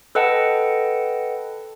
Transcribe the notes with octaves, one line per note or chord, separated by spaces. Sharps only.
A4 B4 D#5 F#5 G5 A5